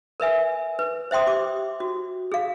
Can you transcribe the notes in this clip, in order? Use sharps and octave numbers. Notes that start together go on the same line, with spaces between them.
A#4 B4 E5 G#5
B4
C5 E5 G5 C6 D#6
G4 D6
F#4
G#4 F5